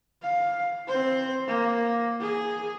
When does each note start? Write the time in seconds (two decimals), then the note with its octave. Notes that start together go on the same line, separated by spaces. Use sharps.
0.22 F5
0.88 C4 C5
1.47 A#3
2.21 G#4